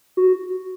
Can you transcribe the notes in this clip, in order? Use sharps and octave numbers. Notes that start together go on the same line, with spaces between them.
F#4